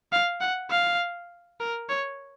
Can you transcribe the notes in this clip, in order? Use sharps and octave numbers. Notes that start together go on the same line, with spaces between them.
F5
F#5
F5
A#4
C#5